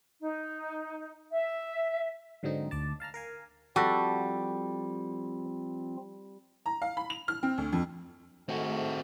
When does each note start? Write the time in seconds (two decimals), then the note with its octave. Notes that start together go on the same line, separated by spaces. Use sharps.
0.22 D#4
1.31 E5
2.43 G#2 D3 F#3 C4 D#4
2.71 D2 D5 A5
3.00 F5 A5 A#5 F6
3.14 A#4 F5 G#5
3.76 F3 G3 C4 F4 F#4 A4
6.66 A#5
6.82 F5
6.97 B5
7.10 F7
7.28 F6
7.43 C4
7.58 D2
7.72 F2
8.49 G#2 A3 C4 F#4